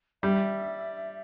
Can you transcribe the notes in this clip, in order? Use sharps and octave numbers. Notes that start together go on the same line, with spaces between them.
G3 E5